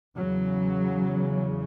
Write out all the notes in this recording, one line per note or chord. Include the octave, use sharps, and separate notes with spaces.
E2 C#3 F#3